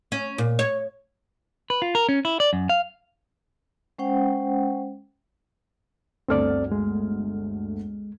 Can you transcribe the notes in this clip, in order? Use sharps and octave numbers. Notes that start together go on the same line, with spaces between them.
C#4
A#2
C#5
B4
F4
A#4
C#4
E4
D5
F#2
F5
G#3 C#4 C5 F#5 G5
G1 D2 C4 A4 D5 F6
G#3